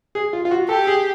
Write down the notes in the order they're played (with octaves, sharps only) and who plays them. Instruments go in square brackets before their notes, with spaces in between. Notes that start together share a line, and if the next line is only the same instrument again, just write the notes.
[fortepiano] G#4
F4
F4
F#4
[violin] G4 [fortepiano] A4
[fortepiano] G#4